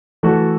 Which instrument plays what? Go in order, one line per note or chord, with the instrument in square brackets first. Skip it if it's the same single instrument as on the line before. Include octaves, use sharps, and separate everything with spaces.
[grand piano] E3 A3 F#4 A4